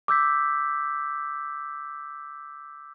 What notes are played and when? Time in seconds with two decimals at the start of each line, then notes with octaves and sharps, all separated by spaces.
0.08 D6 E6 G6 B6